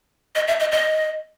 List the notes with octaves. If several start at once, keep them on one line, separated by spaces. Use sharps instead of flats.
D#5
E5
D#5
D#5